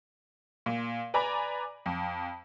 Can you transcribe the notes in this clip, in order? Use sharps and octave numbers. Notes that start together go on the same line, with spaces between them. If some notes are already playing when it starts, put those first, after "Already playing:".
A#2
B4 D5 G#5 A#5 B5 D6
F2